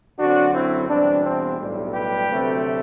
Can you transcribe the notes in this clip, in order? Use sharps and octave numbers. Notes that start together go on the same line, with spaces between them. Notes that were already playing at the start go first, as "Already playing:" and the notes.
F#2 D3 F#3 C4 D4 F#4
C4 E4
E2 B2 G3 C4 D4
C4
B1 A2 G3
G4 B4
D2 C3 F#3 A3 C4